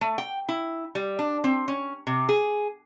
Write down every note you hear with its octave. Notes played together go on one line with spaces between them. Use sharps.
A3
G5
E4
G3
D4
C4
C#4
C3
G#4